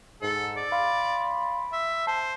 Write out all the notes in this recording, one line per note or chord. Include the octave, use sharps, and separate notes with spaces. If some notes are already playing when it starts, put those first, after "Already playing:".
G#2 A4
D5
F5 B5 C6
E5
C5 A5